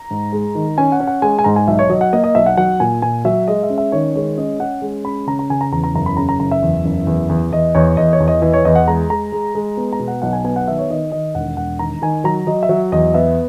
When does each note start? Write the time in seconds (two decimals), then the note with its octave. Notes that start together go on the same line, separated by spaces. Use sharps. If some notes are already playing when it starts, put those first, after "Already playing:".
Already playing: A#5
0.11 G#2
0.32 G#3
0.55 D#3
0.78 C#4 G#5
0.92 F#5
1.00 C#4
1.07 F#5
1.22 G#3 G#5
1.39 G#5
1.44 G#2 A#5
1.56 G#5
1.67 B1 E5
1.79 C#5
1.90 F#3 D#5
2.01 F#5
2.13 A#3 D#5
2.24 D#5
2.35 B1 E5
2.46 F#5
2.57 F#3 F#5
2.80 A#2 G#5
3.02 A#2 G#5
3.25 F#3 E5
3.48 G#3 D#5
3.63 E5
3.70 C#4
3.78 E5
3.92 D#3 C#5
4.15 G#3 C#5
4.37 C#4 D#5
4.59 C#4 F#5
4.82 G#3
5.04 C#4 B5
5.27 C#3 A#5
5.39 A#5
5.50 C#3 G#5
5.61 A#5
5.72 E2 A#5
5.84 A#5
5.95 F#1 A#5
6.06 B5
6.17 C#3 A#5
6.29 A#5
6.40 F#1 A#5
6.51 E5
6.62 E2
6.85 F#1
7.07 E2
7.29 E2
7.52 E2 D#5
7.75 E2 C#5
7.97 E2 D#5
8.13 C#5
8.20 E2
8.28 D#5
8.42 E3 D#5
8.54 C#5
8.65 E2 D#5
8.75 F#5
8.87 G#3 A#5
9.10 G#3 A#5
9.32 G#3
9.55 G#3
9.77 B3
9.93 A#5
9.99 B2
10.08 F#5
10.22 B1 F#5
10.33 G#5
10.44 B3 G#5
10.56 F#5
10.67 D#3 E5
10.79 C#5
10.90 D#3 D#5
11.12 D#3 D#5
11.35 E1 F#5
11.57 E1 F#5
11.79 D#3 A#5
12.02 D#3 G#5
12.24 F#3 A#5
12.47 F#3 D#5
12.63 E5
12.69 F#3
12.92 E2 D#5
13.14 B3 E5